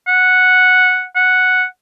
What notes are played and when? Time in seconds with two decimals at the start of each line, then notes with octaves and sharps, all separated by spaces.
0.07 F#5
1.16 F#5